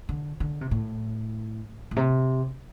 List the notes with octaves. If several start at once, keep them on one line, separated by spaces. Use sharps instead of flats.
D3
D3
C3
A2
A2
C3